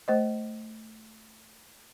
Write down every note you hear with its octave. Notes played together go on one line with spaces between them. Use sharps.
A3 C5 D#5